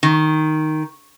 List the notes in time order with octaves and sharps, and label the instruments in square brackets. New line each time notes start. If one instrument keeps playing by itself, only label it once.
[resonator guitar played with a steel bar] D#3